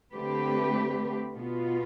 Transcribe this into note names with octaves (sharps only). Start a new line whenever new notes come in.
D3 A3 C4 G4 B4
B2 B3 F4